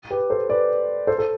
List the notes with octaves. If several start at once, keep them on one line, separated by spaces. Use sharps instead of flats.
G4 B4
A4 C5
B4 D5
A4 C5
A4